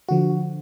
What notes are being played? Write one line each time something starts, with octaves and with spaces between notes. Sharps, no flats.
D3 F3 F#4